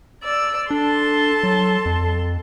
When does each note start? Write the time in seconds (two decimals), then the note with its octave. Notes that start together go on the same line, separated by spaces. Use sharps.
0.22 D5 E6
0.71 D4 A4 A5 C6
1.43 F#3
1.86 F2